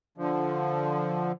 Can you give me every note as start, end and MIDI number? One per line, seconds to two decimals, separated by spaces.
0.18 1.32 50
0.18 1.32 53